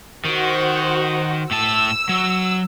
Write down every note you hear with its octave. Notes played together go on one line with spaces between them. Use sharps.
D#3 F#4 C5 F#5
A2 A5 E6
F#3